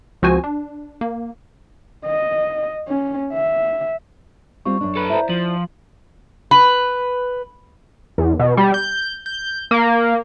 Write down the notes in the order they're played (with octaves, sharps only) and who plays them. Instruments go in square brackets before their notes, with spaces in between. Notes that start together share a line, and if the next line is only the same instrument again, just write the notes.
[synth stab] C#2 F3 C4 F#4 C5 G#5
D4
A#3
[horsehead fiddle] D#5
C#4
E5
[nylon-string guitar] G3 C4 F4 [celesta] C#6
[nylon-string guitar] F#2 D4
[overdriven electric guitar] A4 B4
[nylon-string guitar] E4 C5 D5 [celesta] E5 A#5
[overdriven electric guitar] F3 [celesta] F#7
[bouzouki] B4
[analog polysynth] E2
B2
G3
G6
G6
A#3